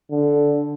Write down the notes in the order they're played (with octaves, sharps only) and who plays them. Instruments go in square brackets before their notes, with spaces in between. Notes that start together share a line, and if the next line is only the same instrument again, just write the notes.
[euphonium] D3